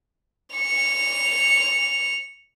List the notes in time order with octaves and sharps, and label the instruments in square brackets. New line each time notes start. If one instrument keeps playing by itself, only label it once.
[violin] C#7 F7